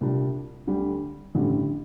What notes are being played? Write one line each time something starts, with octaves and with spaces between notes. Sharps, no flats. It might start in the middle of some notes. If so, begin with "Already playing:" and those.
C2 A#2 G3 D4
D2 D3 G3
A1 G2 D3 G3